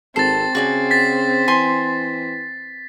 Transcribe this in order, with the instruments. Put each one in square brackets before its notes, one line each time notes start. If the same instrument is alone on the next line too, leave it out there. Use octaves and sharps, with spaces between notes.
[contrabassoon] G#1 [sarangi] C4 [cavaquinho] A4 [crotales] A6 C7
[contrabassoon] C#3 [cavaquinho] F#4 D5 G#5
[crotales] A6 B6
[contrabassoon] E3 [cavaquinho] G#5 C6